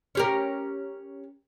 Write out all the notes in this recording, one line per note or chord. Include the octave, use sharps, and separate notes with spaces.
C#4 G4 A#4